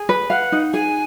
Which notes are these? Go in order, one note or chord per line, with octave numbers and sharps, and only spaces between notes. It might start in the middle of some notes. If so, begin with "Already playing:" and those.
Already playing: G#4
B4
F5 F#5
D#4
G#4 G#5